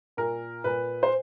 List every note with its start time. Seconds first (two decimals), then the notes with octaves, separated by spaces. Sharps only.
0.17 A#2 A#4
0.64 A#2 B4
1.03 C5